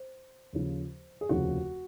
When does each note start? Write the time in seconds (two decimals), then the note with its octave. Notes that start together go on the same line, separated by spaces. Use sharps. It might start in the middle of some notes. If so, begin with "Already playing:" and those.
Already playing: C5
0.53 D#2 C#3 F3
1.21 G#4
1.29 F1 D#2 C#3 F3 F#4